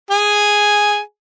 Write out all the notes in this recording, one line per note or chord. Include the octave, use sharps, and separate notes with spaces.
G#4 G#5